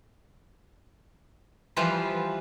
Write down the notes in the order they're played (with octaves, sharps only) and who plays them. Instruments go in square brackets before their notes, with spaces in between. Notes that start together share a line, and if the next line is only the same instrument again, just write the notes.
[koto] E3 F3 G3 F4 B4